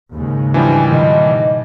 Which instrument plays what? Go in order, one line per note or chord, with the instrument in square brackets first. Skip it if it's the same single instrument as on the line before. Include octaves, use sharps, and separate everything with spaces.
[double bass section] D#2 G#2 C#3
[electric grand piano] E3 F3 G3 [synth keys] D4 [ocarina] G#5
[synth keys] B2 D#3 [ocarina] D#5